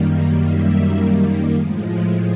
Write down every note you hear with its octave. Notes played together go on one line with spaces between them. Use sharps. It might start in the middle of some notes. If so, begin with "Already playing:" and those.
Already playing: F#2 D#3 G3 A#3
E5
A2 F3 G#3